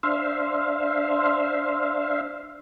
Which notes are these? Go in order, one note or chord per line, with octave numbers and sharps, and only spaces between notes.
D4 C5 E5 F5